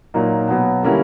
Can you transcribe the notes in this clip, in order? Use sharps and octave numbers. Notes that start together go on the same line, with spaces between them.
A#2 F#3 A#3 D#4
B2 F#3 B3
D3 G3 A#3 C#4 E4